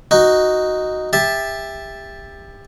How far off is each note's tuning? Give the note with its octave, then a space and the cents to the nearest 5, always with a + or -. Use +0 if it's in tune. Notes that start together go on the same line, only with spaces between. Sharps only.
D#4 +0 F#4 +0
G4 +25 E5 +0 A5 -5